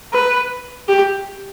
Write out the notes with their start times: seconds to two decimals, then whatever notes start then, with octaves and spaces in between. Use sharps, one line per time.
0.13 B4
0.88 G4